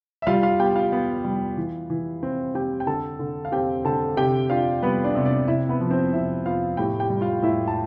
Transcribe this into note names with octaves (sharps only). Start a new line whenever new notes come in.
E5
G3 F4 F5
F4 F5
B3 G4 G5
F4 F5
B3
G3
E3
E3
C4
C4 G4 G5
G5
D3 A4 A5
D3
F5
C4 G4 G5
D3 A4 A5
C3 G4 G5
D4 F4 F5
G3 B3 B4
D4 D5
C3
D4 D5
C3 E4 E5
B3 B4
F3
C4 C5
C3 E4 E5
B3 F4 F5
A2 G4 G5
G4 G5
G3
F4 F5
A2 E4 E5
A5